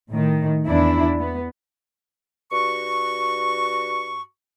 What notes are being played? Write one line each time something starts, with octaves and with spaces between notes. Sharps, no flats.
A2 D#3
E2 D4 E4
B3
G2 F#4 C#6